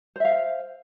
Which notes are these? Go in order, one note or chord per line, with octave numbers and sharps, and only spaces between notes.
C5 E5 F5